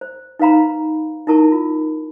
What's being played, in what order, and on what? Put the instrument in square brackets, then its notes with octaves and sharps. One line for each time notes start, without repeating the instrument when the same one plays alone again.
[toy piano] C5
D#4 B4 F5 A#5 B5
D#4 E4 A#4 A5 C#6
F4